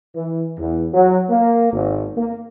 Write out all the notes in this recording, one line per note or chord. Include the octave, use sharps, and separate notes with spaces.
E3
E2
F#3
A#3
G#1
A#3